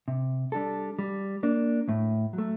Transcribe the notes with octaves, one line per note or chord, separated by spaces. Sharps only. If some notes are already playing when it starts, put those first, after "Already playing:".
C3
G3 D4 A4
G3
A#3 D4
A2
F#3
A3